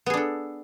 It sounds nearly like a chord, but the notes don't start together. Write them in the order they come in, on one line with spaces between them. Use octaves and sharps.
B3 G#4 D4 A4